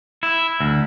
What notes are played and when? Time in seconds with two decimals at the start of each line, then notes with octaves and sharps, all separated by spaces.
0.23 E4
0.60 D2